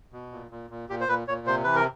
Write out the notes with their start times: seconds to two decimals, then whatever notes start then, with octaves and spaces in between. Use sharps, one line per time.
0.13 B2
0.32 A#2
0.51 A#2
0.70 A#2
0.89 A#2 G4
1.01 C5
1.08 A#2 B4
1.28 A#2 C#5
1.47 C3 C5
1.64 E3 B4
1.76 A#4